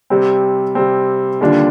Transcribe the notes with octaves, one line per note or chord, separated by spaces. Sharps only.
C3 G3 C4
C3 G3 C4
D#2 D3 G3 D4 F4